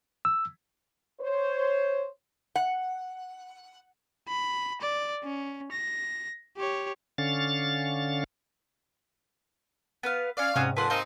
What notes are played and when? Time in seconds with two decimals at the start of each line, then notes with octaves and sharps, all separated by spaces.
0.25 E6
1.20 C5 C#5
2.56 F#5
4.28 B5
4.81 D5
5.24 C#4
5.72 A#6
6.57 G4 C#5
7.18 D3 C#4 F5 A6
10.03 B3 B4 F5
10.37 C#4 D5 F5
10.56 G#2 C3 C#4 F#4 D#6
10.77 F2 A#2 B4 F#5 G#5 A5 C6
10.90 A#3 C4 D#4 G5 D#6